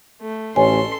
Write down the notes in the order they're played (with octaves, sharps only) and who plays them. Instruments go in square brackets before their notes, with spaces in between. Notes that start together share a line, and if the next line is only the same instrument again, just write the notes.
[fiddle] A3
[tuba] A1 [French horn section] D2 A3 C#4 [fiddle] A4 C6 [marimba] G#5